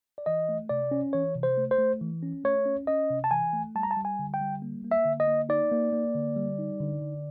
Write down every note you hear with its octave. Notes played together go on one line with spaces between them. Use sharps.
D5
E3 D#5
A3
C3 D5
C#4
E3 C#5
C3
C5
A3
C5
A3
E3
C#4
A3 C#5
C#4
C#4 D#5
C3
A5
E3 G#5
A3
G3 A5
A#5
A5
G3
G#5
D3
G5
G3
A#3
A#3
E5
D3
D#5
A#3
D#4 D5
A#3
A#3
D3
G3
D#4
D3
D3